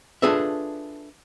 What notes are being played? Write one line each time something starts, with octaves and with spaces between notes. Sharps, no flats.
D4 F4 G#4 A4 B4 E5